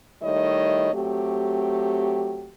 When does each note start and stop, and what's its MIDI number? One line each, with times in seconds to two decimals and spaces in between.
0.22 0.93 51
0.22 0.93 55
0.22 0.93 57
0.22 0.93 64
0.22 0.93 73
0.22 0.93 75
0.93 2.51 54
0.93 2.51 57
0.93 2.51 60
0.93 2.51 67